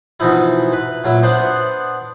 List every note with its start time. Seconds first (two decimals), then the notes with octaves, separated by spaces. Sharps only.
0.20 B2 E3 F3 D#4 E4
0.73 B4
1.04 A#2 F#3 E4
1.23 B3 D4 C5 F#5